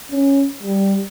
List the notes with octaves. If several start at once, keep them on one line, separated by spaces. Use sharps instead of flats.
C#4
G3